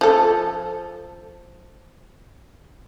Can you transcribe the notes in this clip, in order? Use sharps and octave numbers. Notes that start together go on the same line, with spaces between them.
F3 A4